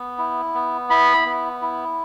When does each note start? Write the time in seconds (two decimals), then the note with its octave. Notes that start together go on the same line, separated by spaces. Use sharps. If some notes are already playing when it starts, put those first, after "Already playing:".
Already playing: B3
0.18 E4
0.54 B3
0.90 E4 B5
1.26 B3
1.62 E4